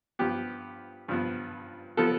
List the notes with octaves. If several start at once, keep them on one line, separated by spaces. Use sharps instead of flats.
G2 F3 B3 G4
G2 F3 B3
F3 B3 A4